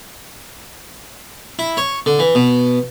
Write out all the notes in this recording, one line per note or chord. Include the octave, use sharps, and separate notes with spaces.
E4
C#5
D3
E3
B2